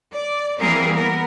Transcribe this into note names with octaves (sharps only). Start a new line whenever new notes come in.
D5
E3 G3 A#3 C4 G#4 A#4
B3 A#4